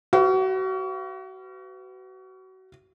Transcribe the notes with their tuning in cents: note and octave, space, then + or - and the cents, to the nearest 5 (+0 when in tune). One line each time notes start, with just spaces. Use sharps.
F#4 +30 B4 +30 F5 -30